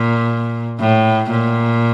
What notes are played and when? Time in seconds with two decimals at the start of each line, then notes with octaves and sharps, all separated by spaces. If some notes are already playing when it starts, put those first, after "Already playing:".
Already playing: A#2
0.80 A2
1.31 A#2